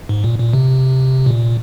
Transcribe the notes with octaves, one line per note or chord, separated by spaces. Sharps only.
G#2
A#2
A#2
C3
A#2